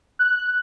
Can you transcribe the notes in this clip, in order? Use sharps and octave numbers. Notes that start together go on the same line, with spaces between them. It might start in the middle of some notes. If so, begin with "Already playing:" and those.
F#6